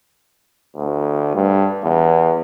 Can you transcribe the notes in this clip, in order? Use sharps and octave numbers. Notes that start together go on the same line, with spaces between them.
D2
G2
E2